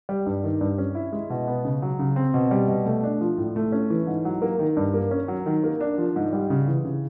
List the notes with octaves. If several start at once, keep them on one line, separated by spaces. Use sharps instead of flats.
G3
G2
D#3
G2
C#4
E4
G#3
B2
B3
C#3
F#3
C#3
C4
B2
G3
B2
A3
D4
F3
A2
A3
C#4
E3
G#2
F#3
A#3
D#3
G2
A#3
C#4
F#3
D#3
A#3
D4
F3
G#2
G3
C#3
E3
C#3